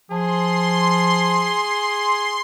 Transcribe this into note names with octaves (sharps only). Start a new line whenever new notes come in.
F3 G#4 C6